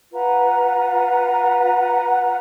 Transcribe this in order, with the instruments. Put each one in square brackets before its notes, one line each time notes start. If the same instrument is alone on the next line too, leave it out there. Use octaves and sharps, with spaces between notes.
[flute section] F4 B4 F#5 A#5